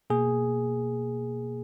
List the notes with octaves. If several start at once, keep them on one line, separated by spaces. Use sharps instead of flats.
B2 A#3 G#4